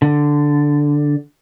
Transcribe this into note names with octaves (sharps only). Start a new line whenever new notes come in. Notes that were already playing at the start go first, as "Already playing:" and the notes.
D3